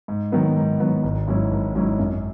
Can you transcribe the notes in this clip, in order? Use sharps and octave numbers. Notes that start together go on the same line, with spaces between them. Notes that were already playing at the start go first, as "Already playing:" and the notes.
G#2
D#3 F#3 B3
G#2
D#3 F#3 B3
G#1
G#2 F#3 C#4 E4
G#1
G#2 F#3 C#4 E4
F#2